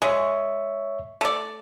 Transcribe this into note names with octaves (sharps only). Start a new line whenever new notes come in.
G#3 C#5 E5 C#6
A3 D5